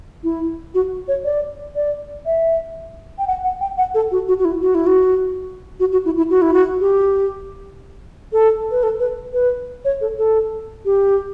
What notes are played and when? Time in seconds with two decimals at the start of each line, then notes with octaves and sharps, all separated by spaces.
0.24 E4
0.74 F#4
1.08 C#5
1.24 D5
1.75 D5
2.26 E5
3.18 G5
3.27 F#5
3.44 F#5
3.61 G5
3.78 F#5
3.94 A4
4.11 F#4
4.28 F#4
4.39 F#4
4.45 E4
4.62 F#4
4.75 E4
4.86 F#4
5.80 F#4
5.92 F#4
6.05 E4
6.17 E4
6.30 F#4
6.42 E4
6.53 F#4
6.80 G4
8.33 A4
8.71 B4
8.83 A4
9.00 B4
9.33 B4
9.85 C#5
10.01 A4
10.18 A4
10.85 G4